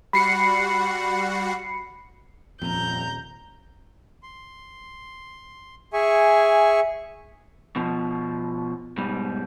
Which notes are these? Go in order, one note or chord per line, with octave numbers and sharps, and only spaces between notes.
G3 F#4 F#5 B5 C7 C#7
D#1 F2 A#2 A#5 G6
C6
G#4 E5 G#5 C#6
B2 F3
G#2 B2 G3